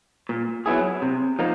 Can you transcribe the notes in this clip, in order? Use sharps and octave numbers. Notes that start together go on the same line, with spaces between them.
A#2
F#3 B3 E4 G#4
C3
F3 A#3 D#4